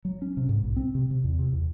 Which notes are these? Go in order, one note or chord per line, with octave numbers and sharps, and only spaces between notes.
F#3
C#4
C3
G#2
B1
C4
C3
C3
E2
C3
E2